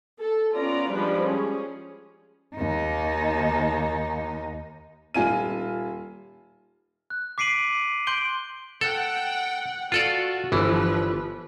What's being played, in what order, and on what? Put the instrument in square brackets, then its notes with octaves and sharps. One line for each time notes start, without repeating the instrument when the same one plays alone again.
[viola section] A4
B3 C#4 F4 D5 A#5
F3 G3 G#3 D4 B4
C#4 G#4
[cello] D#2 D#4
[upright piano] D#1 F4 G#5 D#7
[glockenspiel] F#6
D6 B6 C7 D7 D#7 F#7
C6 G6 D7 F#7 G7
[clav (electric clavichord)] A4 [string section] F#5 G5
[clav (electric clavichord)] F4 A4 D5 [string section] F#4
[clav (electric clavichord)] G1 E3 [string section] F3 B4